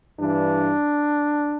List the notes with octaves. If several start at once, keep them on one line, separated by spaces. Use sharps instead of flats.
G2 E3 D4